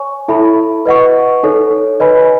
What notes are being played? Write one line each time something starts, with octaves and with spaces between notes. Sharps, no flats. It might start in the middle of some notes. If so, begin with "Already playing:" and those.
Already playing: C#5 G#5 C#6
E4 A4 E5 B5
B4 D#5 F#5 C#6
D#4 A4 C#5
B4 D#5 G#5 B5